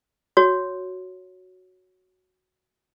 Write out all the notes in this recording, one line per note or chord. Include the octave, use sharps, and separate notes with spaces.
F#4 C#5